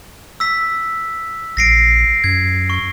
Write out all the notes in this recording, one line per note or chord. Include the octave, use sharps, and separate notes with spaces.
E6 B6
A#1 A#6 C7 D7
F#2 G#6
C#6